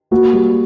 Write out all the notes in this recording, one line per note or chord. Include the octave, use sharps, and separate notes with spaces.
A#3 F#4
G3